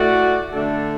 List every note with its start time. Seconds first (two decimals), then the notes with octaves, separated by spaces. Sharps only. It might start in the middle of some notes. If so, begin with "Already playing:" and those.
Already playing: A2 A3 F#4 D5
0.52 D3 A3 D4 A4